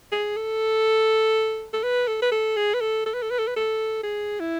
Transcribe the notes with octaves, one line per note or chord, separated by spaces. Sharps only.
G#4
A4
A4
B4
A4
B4
A4
G#4
B4
A4
A4
B4
A4
B4
A4
B4
A4
G#4
E4